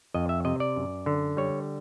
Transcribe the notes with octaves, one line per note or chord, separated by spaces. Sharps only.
F2 D#5
E5
C3 D#5
D5
F#2
D3
G3 C#5